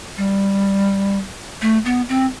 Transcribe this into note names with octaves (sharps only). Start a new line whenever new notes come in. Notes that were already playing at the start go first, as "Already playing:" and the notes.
G3
A3
B3
C4